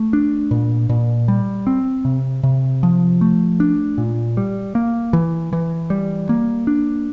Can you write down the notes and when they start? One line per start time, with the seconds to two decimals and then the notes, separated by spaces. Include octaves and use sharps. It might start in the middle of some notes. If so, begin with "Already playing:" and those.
Already playing: A3
0.13 D4
0.51 A#2
0.89 A#2
1.28 G3
1.67 C4
2.05 C3
2.43 C3
2.83 F3
3.21 A3
3.60 D4
3.98 A#2
4.37 G3
4.75 A#3
5.13 E3
5.53 E3
5.90 G3
6.29 A#3
6.67 D4